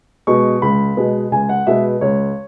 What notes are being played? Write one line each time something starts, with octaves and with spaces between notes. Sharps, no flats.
B2 G#3 B3 C#6
C#2 B5
B2 G#3 B3
C#2 G#5
F#5
B2 G#3 B3 E5
C#2 C#5